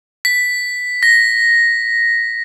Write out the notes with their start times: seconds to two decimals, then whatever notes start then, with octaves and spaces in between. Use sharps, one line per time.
0.25 B6
1.03 A#6